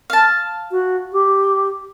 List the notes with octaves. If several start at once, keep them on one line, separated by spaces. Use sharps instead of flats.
F5 A5
F#4
G4